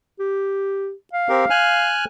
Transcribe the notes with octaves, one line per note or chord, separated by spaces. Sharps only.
G4
F5
C4 G4 A#4
G#5 F6 F#6